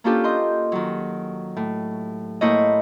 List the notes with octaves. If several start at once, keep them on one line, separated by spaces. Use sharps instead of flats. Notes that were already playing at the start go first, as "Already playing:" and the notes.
A#3 C#4 D4 F4 G4 A4
D#5 C6 G6
D#3 F#3
A2
A2 A#3 E4 C5 C#5 D#5